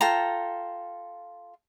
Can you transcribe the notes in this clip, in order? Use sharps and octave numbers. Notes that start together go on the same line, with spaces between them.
F4 A4 G5 A#5